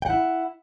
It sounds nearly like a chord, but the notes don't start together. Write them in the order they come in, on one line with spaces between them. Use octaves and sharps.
G5 F#5 E4